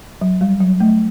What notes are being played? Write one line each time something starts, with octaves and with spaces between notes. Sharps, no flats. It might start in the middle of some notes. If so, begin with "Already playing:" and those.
F#3
G3
F#3
A3